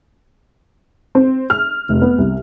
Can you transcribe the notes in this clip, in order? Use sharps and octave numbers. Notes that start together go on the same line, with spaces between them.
C4
F6
F1
B3
C2